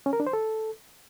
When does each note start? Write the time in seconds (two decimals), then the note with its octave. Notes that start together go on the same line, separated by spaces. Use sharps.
0.06 C#4
0.13 A#4
0.20 D4
0.27 C5
0.33 A4